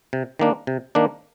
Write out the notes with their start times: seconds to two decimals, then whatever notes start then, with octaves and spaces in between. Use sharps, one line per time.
0.13 C3
0.39 D#3 A#3 D4
0.67 C3
0.95 D#3 A#3 D4